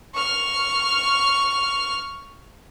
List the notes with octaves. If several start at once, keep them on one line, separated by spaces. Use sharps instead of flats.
C#6 F6